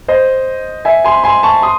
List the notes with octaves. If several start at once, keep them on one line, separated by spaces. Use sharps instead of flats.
C5 D#5
E5 G#5
G#5 C6
G#5 C6
A5 C#6
C6 D#6